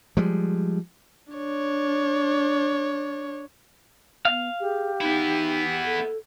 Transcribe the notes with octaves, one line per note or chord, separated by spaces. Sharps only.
F3 G3 G#3
D4 C#5
B3 F5
G4 G#4
B3 D#4 E4
A4